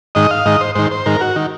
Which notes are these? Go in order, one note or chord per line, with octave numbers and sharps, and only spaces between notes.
G#2 D#3 D#5
F5
G#2 D#3 D#5
C5
G#2 D#3 C5
C5
G#2 D#3 A#4
F#4
D#3